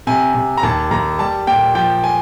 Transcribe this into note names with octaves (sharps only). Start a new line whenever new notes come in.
C3 G#5
C3
A#5
D#2 A5
D#2 A#5
G3 A5
A#2 G5
F3 G5
G#5